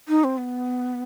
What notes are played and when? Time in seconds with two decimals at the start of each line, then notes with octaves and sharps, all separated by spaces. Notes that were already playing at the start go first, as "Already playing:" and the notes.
0.08 D#4
0.24 C4
0.38 B3